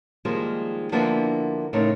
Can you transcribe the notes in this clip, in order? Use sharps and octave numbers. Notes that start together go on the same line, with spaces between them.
D#3 F3 G3 G#3 A#3
D3 F3 A#3 B3 D4 E4
A2 C#3 C4 D#4 A#4 C#5